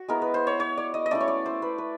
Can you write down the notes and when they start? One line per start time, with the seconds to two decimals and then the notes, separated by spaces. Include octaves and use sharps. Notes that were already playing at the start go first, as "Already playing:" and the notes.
Already playing: F#4
0.08 G#3 B3 E4 A#4
0.22 B4
0.34 C5
0.47 C#5
0.60 C#5
0.77 D5
0.94 D#5
1.06 D#5
1.11 A3 C#4 E4 D5
1.21 C#5
1.28 D5
1.46 C5
1.62 B4
1.78 B4